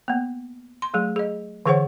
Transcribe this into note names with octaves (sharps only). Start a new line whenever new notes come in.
A#3 B3
C6
F#3 A3 G#4
G#4 D#5
D3 E3 G#4 C5 C#5 F#5